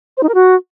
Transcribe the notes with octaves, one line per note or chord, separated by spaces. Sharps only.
C5
D#4
A#4
F#4